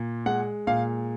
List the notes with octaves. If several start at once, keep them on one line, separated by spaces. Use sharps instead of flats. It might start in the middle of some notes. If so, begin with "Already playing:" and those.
Already playing: A#2
G#3 F#5
A#2 F5